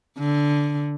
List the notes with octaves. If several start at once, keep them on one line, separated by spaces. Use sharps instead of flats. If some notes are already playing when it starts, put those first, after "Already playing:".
D3